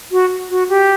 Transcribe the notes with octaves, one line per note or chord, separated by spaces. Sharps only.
F#4
F#4
G4